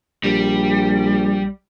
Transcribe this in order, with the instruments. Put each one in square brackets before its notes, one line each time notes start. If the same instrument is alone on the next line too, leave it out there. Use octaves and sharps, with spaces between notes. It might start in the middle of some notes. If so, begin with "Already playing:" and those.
[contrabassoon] A#1 [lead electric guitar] G3